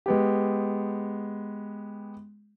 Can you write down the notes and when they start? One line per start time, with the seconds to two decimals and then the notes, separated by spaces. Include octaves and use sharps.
0.06 G#3 B3 G4